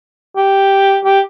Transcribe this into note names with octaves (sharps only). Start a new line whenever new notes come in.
G4
G4